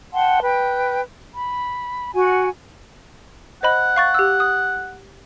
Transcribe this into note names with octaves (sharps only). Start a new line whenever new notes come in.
F#5 G5 A5 C6
B4 G5
B5
F#4 F#5 G#5
C5 D#5 F#5 B5
F5 C#6 A6
G4 E6
D#6